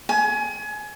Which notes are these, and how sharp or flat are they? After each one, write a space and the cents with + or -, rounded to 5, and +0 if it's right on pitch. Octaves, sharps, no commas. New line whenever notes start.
G#5 +30